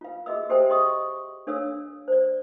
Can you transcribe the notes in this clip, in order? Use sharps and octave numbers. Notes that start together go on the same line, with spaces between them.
F4 F5
F#4 G#4 D#5 E5 E6
F#4 G4 A4 C5 E5 G5
G#4 D#5 C6 C#6 D#6
D4 A4 C#5 F5 E6
C5 D5